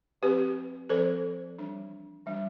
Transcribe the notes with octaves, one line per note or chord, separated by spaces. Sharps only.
F3 C4 G4 B4
F3 C4 A4 C5
E3 G3 D4
E3 G3 D4